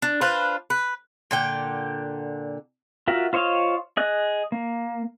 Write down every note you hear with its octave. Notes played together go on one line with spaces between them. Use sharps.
D4
D4 F4 B4 C5
B4
A#2 D3 G5
F4 F#4 A#4 E5
F4 C5 C#5 D#5 F5
G#4 D#5 F#6
A#3